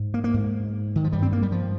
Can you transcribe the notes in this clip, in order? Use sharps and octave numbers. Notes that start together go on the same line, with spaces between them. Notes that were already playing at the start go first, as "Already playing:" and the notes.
Already playing: G#2
A#3
A#3
G#2
D#3
F3
G2 G3
C4
A#3
G3
F3